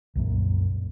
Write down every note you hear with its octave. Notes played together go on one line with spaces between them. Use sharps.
C2 F#2 A#2